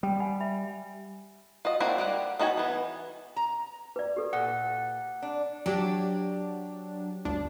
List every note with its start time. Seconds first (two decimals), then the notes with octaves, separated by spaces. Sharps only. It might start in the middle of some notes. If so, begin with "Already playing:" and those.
0.03 G3 G5 B5
0.20 F#5 G#5 B5
0.40 E5 B5
1.65 F4 F#4 D#5
1.80 A#3 C4 D4 E4 F#4
1.98 G3 G4 F#5
2.39 B3 D#4 F#4 E5 G#5
2.57 E3 B3
3.36 A#5
3.96 B4 D5
4.16 G4 A4 B4
4.33 A#2 F#5
5.22 D4
5.66 F#3 D4 G4
7.25 G1 D2 D4